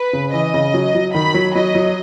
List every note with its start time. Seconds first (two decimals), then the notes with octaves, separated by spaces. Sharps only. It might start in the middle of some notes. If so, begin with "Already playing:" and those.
Already playing: B4
0.13 C#3
0.33 E3 D#5
0.54 C#3
0.74 F#3
0.95 F#3
1.14 D#3 B5
1.34 F#3
1.55 F#3 D#5
1.75 F#3